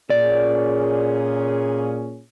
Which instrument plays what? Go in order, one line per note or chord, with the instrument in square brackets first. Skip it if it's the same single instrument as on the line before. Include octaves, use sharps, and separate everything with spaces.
[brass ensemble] A#2 C#4 G#4 [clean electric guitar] D5